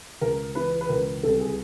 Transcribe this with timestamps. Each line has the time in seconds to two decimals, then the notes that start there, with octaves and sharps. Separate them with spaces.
0.21 C#2 A#4
0.55 E3 B4
0.81 B4
0.89 C#2 A#4
1.23 C2 A4
1.41 G#4